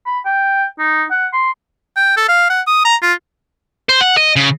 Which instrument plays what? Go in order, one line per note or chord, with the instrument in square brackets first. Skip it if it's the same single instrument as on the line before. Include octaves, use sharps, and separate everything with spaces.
[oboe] B5
G5
D#4
F#5
C6
[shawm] G5
A4
F5
F#5
D#6
A#5
F4
[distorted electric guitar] C5
F#5
D#5
C#3